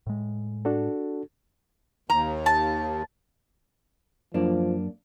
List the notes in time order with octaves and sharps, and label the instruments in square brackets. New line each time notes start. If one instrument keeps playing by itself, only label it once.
[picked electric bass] A2 G#3
[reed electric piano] D4 F#4 A4
[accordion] D#2 [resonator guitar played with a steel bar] A#5
[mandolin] A5
[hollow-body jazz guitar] F#2 A#3 D4 [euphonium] F3